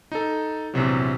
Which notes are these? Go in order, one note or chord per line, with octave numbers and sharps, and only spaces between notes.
D#4 A4
A#1 E2 C3 F#3